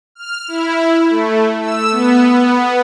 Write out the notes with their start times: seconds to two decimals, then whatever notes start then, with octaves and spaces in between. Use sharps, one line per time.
0.15 F6
0.48 E4
1.10 A3
1.61 E6
1.91 B3
2.31 B3